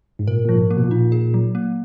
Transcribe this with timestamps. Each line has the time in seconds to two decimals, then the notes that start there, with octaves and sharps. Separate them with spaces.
0.19 G#2
0.28 A#2 A#4
0.45 A#2 F3
0.55 G#2
0.71 A#3
0.77 B2
0.84 A#2
0.91 D#4
1.12 G#4
1.34 F#3
1.55 A#3